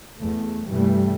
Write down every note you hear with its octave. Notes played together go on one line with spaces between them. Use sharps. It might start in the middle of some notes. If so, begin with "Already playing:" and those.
E2 A3
G2 C3 E3 G3 A3